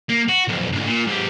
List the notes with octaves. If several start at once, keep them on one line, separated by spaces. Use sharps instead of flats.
A#3
F#4
B1 F2
D2 G#2
A#2
G#2 G4